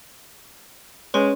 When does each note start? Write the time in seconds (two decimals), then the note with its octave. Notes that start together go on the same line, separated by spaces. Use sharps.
1.14 G#3 C#4 B4 C#5 C6